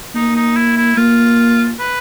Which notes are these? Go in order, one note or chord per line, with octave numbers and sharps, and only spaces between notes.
A#3 D#4
D#4
E4
E4
A#3 F4
B4